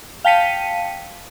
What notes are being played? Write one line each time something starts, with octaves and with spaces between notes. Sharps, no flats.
F5 G5 A5 B6 C#7 D#7